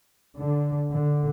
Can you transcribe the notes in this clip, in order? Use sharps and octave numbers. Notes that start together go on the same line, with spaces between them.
D3
D3